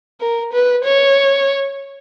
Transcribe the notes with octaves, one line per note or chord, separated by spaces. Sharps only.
A#4
B4
C#5